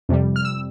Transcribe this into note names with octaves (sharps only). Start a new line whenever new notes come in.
F2 C3 G3
F6
E6